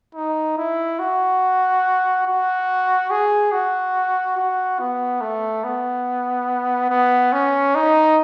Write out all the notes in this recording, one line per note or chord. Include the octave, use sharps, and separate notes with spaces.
D#4
E4
F#4
F#4
G#4
F#4
F#4
B3
A3
B3
B3
C#4
D#4